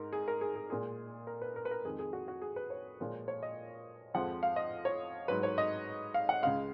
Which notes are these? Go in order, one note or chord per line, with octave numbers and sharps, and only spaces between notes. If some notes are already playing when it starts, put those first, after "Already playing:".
Already playing: G#2 A#4
G#4
A#4
G#4
G#4
A#2 G#3 G#4
A#4
B4
A#4
B4
A#4
F2 D#3 G#3 G#4
G#4
F#4
F#4
G#4
B4
C#5
A#2 F3 G#3
C#5
D#5
F2 F3 G#3 F#5
F5
D#5
C#5
G#2 F#3 B4
C#5
D#5
F5
F#5
C#2 C#3 G#3 F5